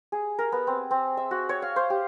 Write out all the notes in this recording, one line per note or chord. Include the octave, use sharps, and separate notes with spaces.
G#4
A#4
B3
C4
C4
E5
F#4
C#5
F5
C5
G4